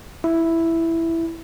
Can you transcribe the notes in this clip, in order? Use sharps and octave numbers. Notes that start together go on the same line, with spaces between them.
E4